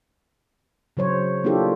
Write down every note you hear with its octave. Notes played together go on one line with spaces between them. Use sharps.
C#3 F#3 C5 C#5
A#3 D4 E4 F4 G4 A4